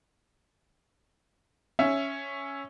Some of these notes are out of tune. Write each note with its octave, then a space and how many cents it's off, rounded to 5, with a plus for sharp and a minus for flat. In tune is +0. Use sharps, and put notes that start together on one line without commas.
C#4 +0 E5 +5